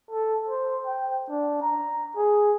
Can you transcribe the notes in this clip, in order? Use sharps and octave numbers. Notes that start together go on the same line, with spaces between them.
A4
C5
G5
D4
A#5
G#4